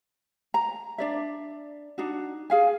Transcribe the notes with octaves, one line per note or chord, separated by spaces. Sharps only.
A#5
D4 D5 E5
D4 D#4 F#4
G#4 F5 G#5